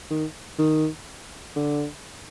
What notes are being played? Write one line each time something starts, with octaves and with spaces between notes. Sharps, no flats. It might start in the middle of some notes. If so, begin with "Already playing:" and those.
D#3
D#3
D3